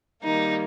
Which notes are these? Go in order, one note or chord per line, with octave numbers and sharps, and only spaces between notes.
D#3 G3 A#3 D#4